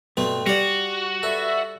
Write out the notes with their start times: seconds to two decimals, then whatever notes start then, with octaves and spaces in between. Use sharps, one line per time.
0.17 G2 B2 A3 C4
0.46 G3 F#4 D5 F5
1.23 A4 B4 D5 E5